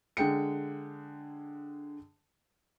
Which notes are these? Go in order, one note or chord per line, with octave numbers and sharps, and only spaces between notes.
D3 G#3 G5 C#7